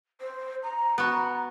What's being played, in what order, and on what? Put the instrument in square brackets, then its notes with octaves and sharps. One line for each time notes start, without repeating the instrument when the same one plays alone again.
[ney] C5
A#5
[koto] B3 F#4